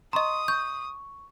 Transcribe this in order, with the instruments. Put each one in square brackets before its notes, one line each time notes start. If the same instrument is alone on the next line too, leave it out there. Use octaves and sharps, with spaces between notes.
[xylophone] D#5 A#5 [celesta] C6 C#6 [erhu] D#6
[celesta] C#6 [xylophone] G6